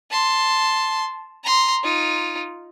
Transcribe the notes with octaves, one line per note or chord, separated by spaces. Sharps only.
A5 C6
A#5 C6
D#4 F4